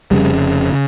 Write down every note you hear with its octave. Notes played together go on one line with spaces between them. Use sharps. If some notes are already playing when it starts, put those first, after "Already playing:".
F1 F2 C#3 G3
C#3